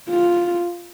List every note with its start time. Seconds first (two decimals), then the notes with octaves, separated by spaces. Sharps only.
0.09 F4